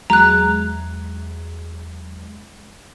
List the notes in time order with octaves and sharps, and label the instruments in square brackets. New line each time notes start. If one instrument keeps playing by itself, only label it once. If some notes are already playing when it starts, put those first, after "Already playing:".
[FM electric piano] E2 F#3 G#3 [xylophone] A#5 F#6